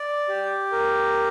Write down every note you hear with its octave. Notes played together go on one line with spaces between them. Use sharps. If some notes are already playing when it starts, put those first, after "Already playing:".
Already playing: D5
G4
A#4